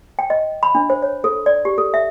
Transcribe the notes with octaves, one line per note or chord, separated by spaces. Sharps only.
G5
D#5
B5
D4
C5
C#5
A4
D5
G4
A4
E5